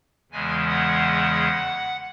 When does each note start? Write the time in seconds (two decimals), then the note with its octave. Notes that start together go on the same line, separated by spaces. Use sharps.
0.31 E2 C#3 E3 G#3 G#5
0.68 F#5